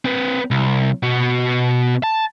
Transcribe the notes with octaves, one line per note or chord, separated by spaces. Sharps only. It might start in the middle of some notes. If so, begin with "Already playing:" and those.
C4 B4
C2
B2 F#4
A5